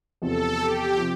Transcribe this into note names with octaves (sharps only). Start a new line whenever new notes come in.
E2 C3 F3 A4
G4
C3 F3